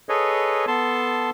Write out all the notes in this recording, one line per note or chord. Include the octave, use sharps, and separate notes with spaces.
G#4 A4 B4 C#5 D#5
B3 A4 A5 C6